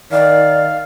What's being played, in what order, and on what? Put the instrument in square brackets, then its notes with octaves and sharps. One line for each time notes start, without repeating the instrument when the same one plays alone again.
[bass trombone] D#3 [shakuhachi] D5 [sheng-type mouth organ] F5